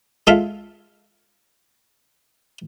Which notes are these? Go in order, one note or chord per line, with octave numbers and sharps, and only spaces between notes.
G#3 F4 A4 E5 F5